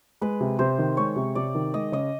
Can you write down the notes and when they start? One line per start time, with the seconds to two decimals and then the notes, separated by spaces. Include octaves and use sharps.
0.21 G#3 B4
0.41 C3
0.59 C3 C5
0.79 D#3
0.97 G#3 C#5
1.16 C3
1.35 C3 D5
1.55 D#3
1.74 G#3 D#5
1.92 C#3 D#5